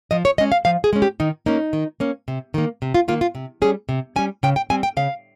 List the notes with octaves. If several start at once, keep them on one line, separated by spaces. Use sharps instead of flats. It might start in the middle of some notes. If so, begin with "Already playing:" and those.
F3 D#5
C#5
G#3 C#4 D#5
F5
F3 F5
G#4
G#3 C#4
G4
D#3 D#4
A#3 C#4 D#4
D#3
A#3 C#4
C3
D#3 A#3
C3
F4
D#3 A#3 F4
F4
C3
G3 C#4 G#4
C3
G3 C#4 G#5
C#3 G5
G5
G3 C4 G#5
G5
C#3 F5